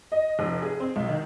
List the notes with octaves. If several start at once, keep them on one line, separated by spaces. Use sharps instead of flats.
D#5
F1
G#4
C4
B1
D#3